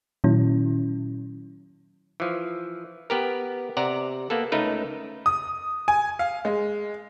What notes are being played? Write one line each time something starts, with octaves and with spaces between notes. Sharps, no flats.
A#2 D#3 F#3 C#4 E4
E3 F3
B3 G4 A#4
C3 D5 F#5 A#5
A#3 B3 A4
C#2 A3 D#4 A#4 B4
D#6
G#5
F5
G#3